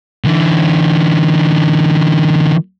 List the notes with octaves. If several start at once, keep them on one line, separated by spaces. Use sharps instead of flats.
D3 E3